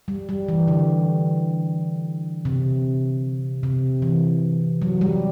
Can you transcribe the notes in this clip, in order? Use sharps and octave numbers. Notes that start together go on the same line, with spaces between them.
G3
G3
E3
D3
C3
C3
E3
F#3
G3